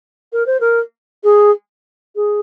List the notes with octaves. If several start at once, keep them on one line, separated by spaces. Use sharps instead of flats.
A#4
C5
A#4
G#4
G#4